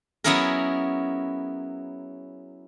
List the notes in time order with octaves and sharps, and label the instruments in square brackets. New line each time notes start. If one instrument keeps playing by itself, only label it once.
[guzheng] F#3 B3 C#4 E4 G#4 A#4